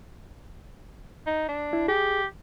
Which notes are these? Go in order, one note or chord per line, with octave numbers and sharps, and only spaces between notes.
D#4
D4
E4
G4 G#4